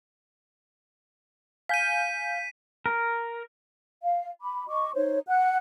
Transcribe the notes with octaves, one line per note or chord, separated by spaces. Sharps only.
F5 G#5 G6 B6 D#7
A#4
F5
B5 D6
D#5 C#6 D6
D#4 C5 C#5
F#5 F#6